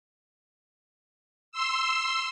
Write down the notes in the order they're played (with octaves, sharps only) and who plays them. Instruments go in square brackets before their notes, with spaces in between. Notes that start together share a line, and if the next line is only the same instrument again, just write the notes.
[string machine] C6 E6